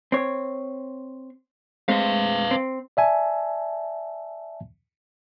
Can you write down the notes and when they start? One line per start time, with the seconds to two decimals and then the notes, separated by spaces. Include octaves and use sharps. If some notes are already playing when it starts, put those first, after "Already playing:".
0.12 C4 C#5
1.88 G#3 A3 C4 B4 F5
2.51 C4
2.97 D5 E5 G#5 A5